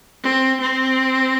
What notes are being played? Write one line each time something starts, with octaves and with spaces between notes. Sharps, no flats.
C4
C4